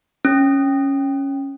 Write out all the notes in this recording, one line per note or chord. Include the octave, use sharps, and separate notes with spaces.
C#4